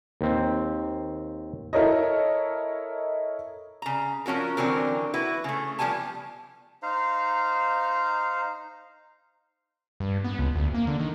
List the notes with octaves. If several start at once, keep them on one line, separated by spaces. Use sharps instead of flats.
D#2 C4
E4 A4 A#4 C#5 D#5
C#3 A#5
F3 C#4 F#4 A#4
D3 E3 F#3 C4 A#4
E4 F#4 B4
C#3 A3
F3 G3 B3 G#5 A5
D#4 C5 F5 A#5
G2
B3
C#2
D2
A#3
D3
D#3